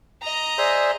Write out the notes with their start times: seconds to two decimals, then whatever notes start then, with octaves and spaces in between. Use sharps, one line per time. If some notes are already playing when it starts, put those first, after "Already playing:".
0.22 D#5 A#5
0.58 G#4 C5 D5 E5